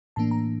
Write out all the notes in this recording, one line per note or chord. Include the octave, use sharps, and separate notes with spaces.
A2 E3 A#3 D4 A5
A#5